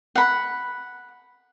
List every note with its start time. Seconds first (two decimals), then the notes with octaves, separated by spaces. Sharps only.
0.15 F#5 B5